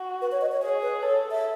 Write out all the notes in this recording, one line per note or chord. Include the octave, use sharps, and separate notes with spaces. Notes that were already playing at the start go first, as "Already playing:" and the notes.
Already playing: F#4
B4
C#5
D#5
C#5
G#4 C#5
B4
A4 C#5
E5